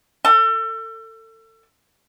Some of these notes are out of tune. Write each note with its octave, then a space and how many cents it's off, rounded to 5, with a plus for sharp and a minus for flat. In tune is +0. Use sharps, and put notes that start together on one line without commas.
A4 +30